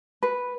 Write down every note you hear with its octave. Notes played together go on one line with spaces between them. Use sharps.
B4